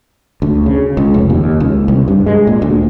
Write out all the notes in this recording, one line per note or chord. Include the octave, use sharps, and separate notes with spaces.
D2
C#3
C#2
F1
D#2
C#2
C2
G2
G#3
A#2
D2